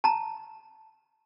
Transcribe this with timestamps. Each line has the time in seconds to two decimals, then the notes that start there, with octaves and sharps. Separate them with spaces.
0.04 A5 A#5